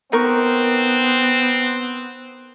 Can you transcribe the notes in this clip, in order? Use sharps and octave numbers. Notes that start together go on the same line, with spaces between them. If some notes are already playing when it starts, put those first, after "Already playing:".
B3 C4 D#4 A#4 C#6